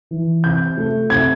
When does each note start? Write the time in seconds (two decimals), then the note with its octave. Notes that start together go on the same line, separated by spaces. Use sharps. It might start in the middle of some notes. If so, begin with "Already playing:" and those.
0.11 E3
0.44 C3 G6
0.77 A3
1.10 C3 G#6